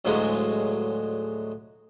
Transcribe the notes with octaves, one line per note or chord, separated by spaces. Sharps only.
D2 A2 F3 F#3 G#3